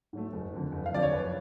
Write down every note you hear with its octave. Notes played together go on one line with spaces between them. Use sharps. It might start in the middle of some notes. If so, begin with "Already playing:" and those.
G#2 F#3 A3
F#1
F2 D3
F#1
F5
F2 D3 D5
C#5
F#1 B4